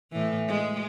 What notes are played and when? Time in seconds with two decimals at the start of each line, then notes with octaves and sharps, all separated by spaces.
0.12 A2 E3
0.48 G#3